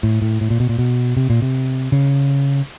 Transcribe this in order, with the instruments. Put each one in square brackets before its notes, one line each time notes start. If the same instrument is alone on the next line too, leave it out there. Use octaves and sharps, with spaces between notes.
[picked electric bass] A2
A2
A2
A#2
B2
A#2
B2
C3
A#2
C3
C#3